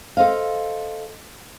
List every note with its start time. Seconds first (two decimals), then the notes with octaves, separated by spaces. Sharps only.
0.17 A4 C5 D#5 F5